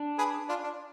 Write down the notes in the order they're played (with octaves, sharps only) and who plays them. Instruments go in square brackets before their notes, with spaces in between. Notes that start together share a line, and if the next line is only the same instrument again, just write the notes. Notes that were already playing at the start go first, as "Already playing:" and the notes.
Already playing: [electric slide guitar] D4
[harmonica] G#4 B4
D4 F4
D4